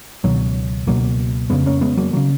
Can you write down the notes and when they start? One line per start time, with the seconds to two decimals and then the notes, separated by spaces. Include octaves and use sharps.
0.24 C#2 B2 D#3 F#3
0.87 C#2 B2 F#3 A#3
1.50 F2 C#3 G#3 B3
1.66 A#3 C#4
1.81 G#3 B3
1.97 F#3 A#3
2.13 D#3 F#3
2.17 C#3